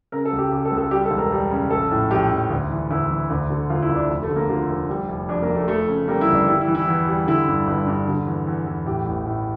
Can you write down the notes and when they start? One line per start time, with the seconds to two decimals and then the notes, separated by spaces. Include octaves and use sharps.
0.12 C#3 A#4
0.25 A4
0.32 C#2
0.39 G4
0.52 C#3 G4
0.65 A4
0.72 C#2
0.78 A4
0.91 G3 G4
1.05 A4
1.11 E1
1.18 A#4
1.32 G3
1.51 C#3
1.70 A#1 A4
1.91 A2
2.11 A#1 G4
2.31 A#1
2.50 D2
2.70 E3
2.91 D2 E4
3.10 E3
3.30 D2
3.50 D3
3.70 D2 F4
3.82 E4
3.90 D2
3.96 D4
4.10 F1
4.23 A3
4.29 D3
4.36 A#3
4.49 D3 F4
4.69 F1
4.89 G3
5.09 F1
5.29 F2 D4
5.42 A#3
5.48 F1
5.55 A3
5.68 F2 A3
5.88 C#3
6.08 G3 A#3
6.21 E4
6.28 G1
6.34 D4
6.48 G3 E4
6.61 E4
6.68 E3
6.75 E4
6.87 E2
7.07 G3
7.27 D3 E4
7.48 G2
7.67 G1
7.87 G2
8.07 D3
8.27 E2
8.47 E2
8.66 E2
8.86 A2 G4
9.06 A1
9.26 A2